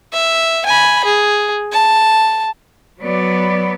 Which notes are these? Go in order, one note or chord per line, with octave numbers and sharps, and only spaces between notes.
E5
G#5 B5
G#4
A5
F#3 B3 D5